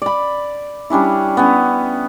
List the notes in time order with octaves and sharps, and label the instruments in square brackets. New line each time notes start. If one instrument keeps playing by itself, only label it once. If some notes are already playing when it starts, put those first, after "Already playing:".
[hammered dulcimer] D5 B5
G3 C#4 D4 E4
B3 C#4